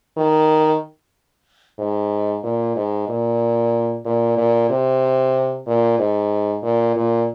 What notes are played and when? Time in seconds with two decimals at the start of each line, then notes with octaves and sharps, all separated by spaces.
0.17 D#3
1.79 G#2
2.43 A#2
2.76 G#2
3.09 A#2
4.05 A#2
4.38 A#2
4.70 C3
5.67 A#2
5.99 G#2
6.63 A#2
6.96 A#2